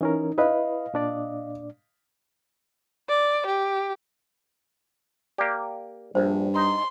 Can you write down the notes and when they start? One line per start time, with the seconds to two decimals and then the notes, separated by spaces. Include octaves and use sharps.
0.01 E3 C#4 D#4 A#4
0.38 E4 B4 D#5 F5
0.94 A#2 D4 D5
3.09 D5
3.46 G4
5.38 A#3 G4 D5
6.15 A#1 G2 C5
6.56 D#4 C6